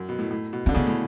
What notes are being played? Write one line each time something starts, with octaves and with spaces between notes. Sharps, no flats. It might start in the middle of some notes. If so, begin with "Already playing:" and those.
Already playing: F#2
B2
A2
A2
B2
D3 C#4
C#3 B3
A2